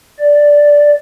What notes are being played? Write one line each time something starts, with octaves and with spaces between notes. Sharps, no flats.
D5